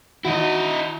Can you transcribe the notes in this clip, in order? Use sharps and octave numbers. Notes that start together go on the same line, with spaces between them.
D#3 E4 F#4 D#5